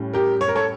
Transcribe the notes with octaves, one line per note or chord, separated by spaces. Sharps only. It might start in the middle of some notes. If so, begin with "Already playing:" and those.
Already playing: A2 G3 C#4
G4 A#4
C#5
A#4
A4 C#5